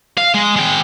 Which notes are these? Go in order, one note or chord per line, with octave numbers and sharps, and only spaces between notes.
F5
G#3
G#3 G5